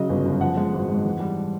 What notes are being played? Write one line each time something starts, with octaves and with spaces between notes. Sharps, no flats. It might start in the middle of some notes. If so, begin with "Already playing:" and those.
Already playing: C#3 F#3 D#5
G1
F#2
F3 F#5
G#3
G#1
G#2
E3
G3